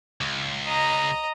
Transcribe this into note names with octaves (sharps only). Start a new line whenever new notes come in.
C#2
D#5 A#5